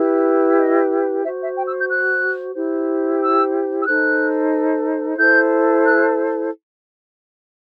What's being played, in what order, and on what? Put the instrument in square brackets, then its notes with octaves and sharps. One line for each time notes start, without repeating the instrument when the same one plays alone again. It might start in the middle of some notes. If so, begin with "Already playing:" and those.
Already playing: [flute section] E4 G4 B4
D#5
F#4 C5 E5
E5
G5
E6
G6
F#6
E4 G4 C5
E6
E6
D#4 A4 C5 F#6
E4 A4 C5 G6
F#6